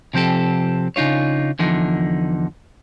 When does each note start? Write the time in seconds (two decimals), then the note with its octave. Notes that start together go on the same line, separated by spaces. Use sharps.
0.14 C3 F3 C4 G4 A4
0.96 C#3 D4 D#4 F4 C#5
1.59 E2 D3 F3 D#4